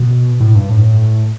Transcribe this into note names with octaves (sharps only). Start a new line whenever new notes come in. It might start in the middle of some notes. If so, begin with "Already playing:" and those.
Already playing: B2
A2
G2
A2